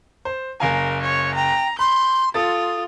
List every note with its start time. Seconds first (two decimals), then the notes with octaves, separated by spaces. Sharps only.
0.25 C5
0.60 F#1 A#4 F5 G#5
1.02 C#5
1.35 G5 A#5
1.79 B5 C6 G6
2.34 F4 A4 D#6 A6